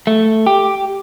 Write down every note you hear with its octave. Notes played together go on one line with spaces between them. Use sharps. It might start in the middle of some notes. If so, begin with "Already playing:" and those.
A3
G4